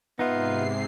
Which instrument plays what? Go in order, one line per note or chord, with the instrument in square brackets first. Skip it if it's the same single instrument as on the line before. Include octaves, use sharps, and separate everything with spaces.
[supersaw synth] G#2 C3 C7 [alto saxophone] B3 [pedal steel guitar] D#4 F4 [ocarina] E5